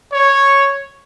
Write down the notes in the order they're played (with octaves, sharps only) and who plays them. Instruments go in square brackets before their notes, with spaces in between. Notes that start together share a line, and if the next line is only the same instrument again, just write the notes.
[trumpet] C#5